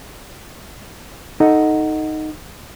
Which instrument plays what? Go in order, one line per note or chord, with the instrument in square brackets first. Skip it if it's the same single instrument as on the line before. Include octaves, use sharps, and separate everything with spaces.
[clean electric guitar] D#4 A4 D#5 F#5